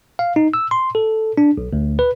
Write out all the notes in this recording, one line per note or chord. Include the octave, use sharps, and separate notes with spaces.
F5
D#4
E6
C6
A4
D4
B1
D2
B4